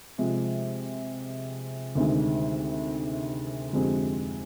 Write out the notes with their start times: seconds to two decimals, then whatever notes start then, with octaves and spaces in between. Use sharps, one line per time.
0.18 C3 F3 G#3
1.95 D2 C3 D#3 G#3
3.73 F2 D3 G#3 C4 G4